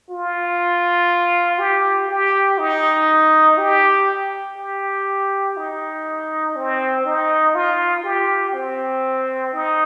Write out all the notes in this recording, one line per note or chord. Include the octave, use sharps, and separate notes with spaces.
F4
G4
G4
D#4
G4
G4
D#4
C4
D#4
F4
G4
C4
D#4